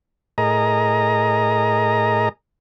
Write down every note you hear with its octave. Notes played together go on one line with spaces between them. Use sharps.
A2 G#4 A#4 D#5 A#5